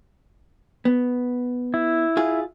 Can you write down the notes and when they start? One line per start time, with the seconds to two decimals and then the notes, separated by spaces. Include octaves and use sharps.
0.85 B3
1.74 E4
2.17 F4 G#4